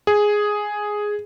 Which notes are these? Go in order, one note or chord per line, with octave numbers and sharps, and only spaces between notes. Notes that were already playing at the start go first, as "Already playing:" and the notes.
G#4